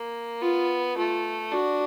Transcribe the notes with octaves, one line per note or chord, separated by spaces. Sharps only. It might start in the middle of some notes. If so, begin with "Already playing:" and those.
Already playing: A#3
B3 F4
A3 F4
D4 F#4